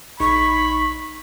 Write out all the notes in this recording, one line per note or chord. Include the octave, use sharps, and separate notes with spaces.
A#1 D#4 B5 C#6